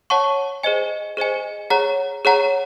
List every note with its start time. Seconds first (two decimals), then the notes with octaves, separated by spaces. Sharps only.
0.10 C#5 F#5 A5 C#6
0.63 G#4 C5 D#5 G#5
1.17 G#4 C5 D#5 G#5
1.70 G#4 C#5 F#5 A#5
2.25 G#4 C#5 F#5 A#5